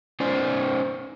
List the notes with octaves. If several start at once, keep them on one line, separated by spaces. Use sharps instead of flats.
C#4 D#4 C5 D5